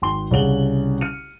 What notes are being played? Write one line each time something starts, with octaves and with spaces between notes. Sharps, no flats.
G#1 G5 C6 G7
C2 C#3 C#4 F#5 F#7 G7
F6 C#7 D#7